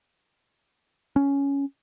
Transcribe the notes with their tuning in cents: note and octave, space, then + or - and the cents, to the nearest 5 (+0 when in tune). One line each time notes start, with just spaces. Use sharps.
C#4 +10